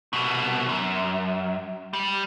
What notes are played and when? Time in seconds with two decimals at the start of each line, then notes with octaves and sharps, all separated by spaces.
0.13 C2 B2
0.69 F#2
1.93 G3